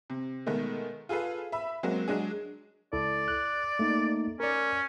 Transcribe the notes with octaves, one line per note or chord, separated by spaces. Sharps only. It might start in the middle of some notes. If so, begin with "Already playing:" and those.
C3
B2 D#3 G#3 A3
F4 G#4 A4 B4 F5
E5 B5 E6
F#3 G#3 A#3 C4
F#3 G#3 D4 G#4
C#2 E4 A4 D5
F#6
A3 A#3 D#4
C#4 A#4 D5